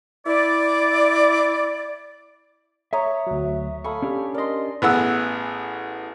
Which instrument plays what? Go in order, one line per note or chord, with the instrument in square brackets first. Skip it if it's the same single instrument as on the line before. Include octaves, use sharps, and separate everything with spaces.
[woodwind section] E4 D5
[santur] C#5 A#5 D#6 [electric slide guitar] E5
[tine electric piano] D2 F#3
[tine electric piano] A4 F5 C#6 [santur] G#5 B5 D#6
[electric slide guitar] C#4 D4 G4
[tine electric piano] A#4 D#5 [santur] D5 C6
[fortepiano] A1 B3 G#4 F#5 E6